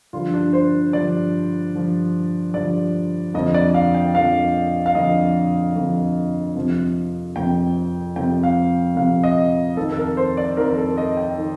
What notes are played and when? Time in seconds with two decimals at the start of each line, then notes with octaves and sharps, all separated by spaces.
0.13 G2 D3 F3 F4
0.34 D4
0.53 C5
0.93 G2 D3 F3 D5
1.74 G2 D3 F3
2.54 G2 D3 F3 D5
3.34 F2 D3 F3 D#5
3.54 D5
3.74 F5
3.95 G5
4.15 F2 D3 F3 F5
4.86 F5
4.95 F2 D3 F3 D#5
5.75 F2 D3 F3
6.56 F2 C3 F3
7.36 F2 C3 F3 G5
8.16 F2 C3 F3 G5
8.43 F5
8.96 F2 C3 F3 F5
9.24 D#5
9.77 F2 D#3 A4
9.92 A4
9.97 A#4
10.17 C5
10.37 D5
10.57 F2 D#3 A#4
10.70 A#4
10.77 A4
10.98 D#5
11.17 G5
11.37 D#3